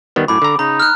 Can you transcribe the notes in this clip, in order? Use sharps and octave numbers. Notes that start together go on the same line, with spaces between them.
D#3 G3 B3
F#2 A2 B5 D6
D3 A#5
C#3 D#4 A#5
F6 F#6